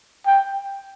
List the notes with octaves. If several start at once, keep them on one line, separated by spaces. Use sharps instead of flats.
G5